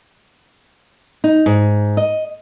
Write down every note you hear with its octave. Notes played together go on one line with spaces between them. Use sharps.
D#4
G#2
D#5